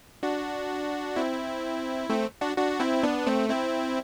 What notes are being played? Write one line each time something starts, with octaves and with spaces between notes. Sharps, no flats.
D4 F#4
C4 E4
A3 C4
D4 F#4
D4 F#4
C4 E4
B3 D4
A3 C4
C4 E4